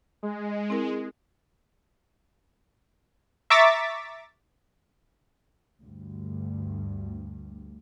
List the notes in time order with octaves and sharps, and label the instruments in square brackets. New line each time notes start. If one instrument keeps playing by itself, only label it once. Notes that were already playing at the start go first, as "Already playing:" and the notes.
[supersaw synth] G#3
[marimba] C4 E4 A#4
[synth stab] E5 A#5 C#6 D6 A6 B6
[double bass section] D2 G2